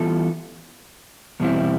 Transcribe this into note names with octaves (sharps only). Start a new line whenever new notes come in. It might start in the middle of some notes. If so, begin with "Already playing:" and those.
Already playing: E3 G3 B3 F4 A4
E2 B2 G3 C4 E4